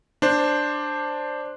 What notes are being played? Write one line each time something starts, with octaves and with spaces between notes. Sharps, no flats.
D4 C5